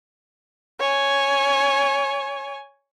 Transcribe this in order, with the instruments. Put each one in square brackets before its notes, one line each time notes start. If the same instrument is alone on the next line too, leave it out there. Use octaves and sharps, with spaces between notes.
[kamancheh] C#5 G#5